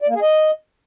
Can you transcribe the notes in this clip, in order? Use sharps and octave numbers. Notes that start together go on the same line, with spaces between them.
D5
A#3
G#4
D#5